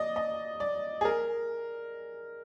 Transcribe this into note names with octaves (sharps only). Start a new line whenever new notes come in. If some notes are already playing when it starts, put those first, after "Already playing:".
Already playing: D5 D#5
D#5
D5
G#4
A#4